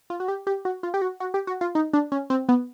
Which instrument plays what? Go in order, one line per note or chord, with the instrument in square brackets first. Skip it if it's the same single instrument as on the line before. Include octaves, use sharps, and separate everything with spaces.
[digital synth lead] F4
F#4
G4
G4
F#4
F4
G4
F#4
F#4
G4
F#4
F4
D#4
D4
C#4
C4
B3